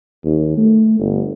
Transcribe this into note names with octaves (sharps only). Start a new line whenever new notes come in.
D#2
A3
G1